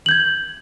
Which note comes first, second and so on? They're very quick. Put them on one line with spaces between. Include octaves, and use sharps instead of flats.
F#7 G6 G#6